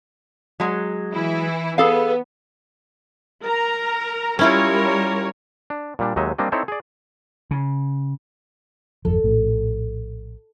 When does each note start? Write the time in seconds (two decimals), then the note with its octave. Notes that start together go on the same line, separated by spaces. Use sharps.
0.60 F#3 G#3
1.13 E3 E4
1.78 B3 G#4 A4 F5
3.44 A#4 A#5
4.39 G3 C#4 E4 F4 A#4 C#5
5.70 D4
5.99 A#2 G3 D4
6.16 D#2 F#3 G#3 D#4 D#5 E5
6.38 G3 A#3 C4 D4 D#5
6.52 C4 D#4 E4 A4 C5 C#5
6.68 G#4 D5
7.51 C#3
9.05 G#1 F2 F3 A4
9.24 A#1 A2